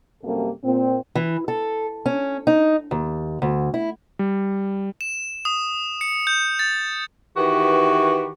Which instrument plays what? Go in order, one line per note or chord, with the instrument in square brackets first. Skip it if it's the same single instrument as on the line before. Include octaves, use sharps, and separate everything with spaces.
[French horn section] F#2 C3 G3 A#3 A4
A#2 C4
[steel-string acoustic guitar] E3
A4
C#4
D#4
D#2
D2
E4
[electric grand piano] G3
[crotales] E7
D#6
C#7
G6
A6
[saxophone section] D#3 E3 F#4 G4 B4